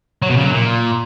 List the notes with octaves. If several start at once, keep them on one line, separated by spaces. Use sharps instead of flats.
F#3
B2
C#3
F#3
A#2